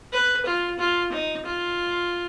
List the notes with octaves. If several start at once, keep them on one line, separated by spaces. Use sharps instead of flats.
B4
F4
F4
D#4
F4